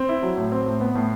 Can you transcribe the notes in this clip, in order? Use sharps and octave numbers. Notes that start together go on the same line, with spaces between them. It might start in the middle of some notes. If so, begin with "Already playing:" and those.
Already playing: C4
E4
F#3
A2
C4
A2
B3
A2